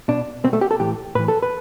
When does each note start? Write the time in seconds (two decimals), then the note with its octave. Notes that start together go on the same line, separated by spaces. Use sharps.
0.08 B2 D4
0.44 B2 C4
0.53 A3
0.61 G4
0.71 A4
0.80 A2 E3 G4
1.15 A2 E3 B4
1.28 A4
1.43 B4